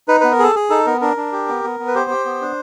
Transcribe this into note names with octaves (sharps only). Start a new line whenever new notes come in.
D#4 B4
B3 B4
A#4
G#4 A4
G#4
D#4 A4
B3 A#4
D4 A#4
D4
G4
B3
B3
B3
B4
G4 C5
G4
B3
D4